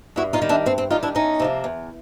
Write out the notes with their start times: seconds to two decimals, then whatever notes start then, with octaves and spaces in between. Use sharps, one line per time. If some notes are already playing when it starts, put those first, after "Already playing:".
0.16 G2 E4 F#4
0.33 D#4 F4
0.42 D#3 G3
0.49 D4 E4
0.66 G2 C4
0.78 C4
0.90 D#3 G3 D#4 F4
1.03 D4 E4
1.15 E2 C#4 D#4
1.40 C3 F3 A#3
1.64 E2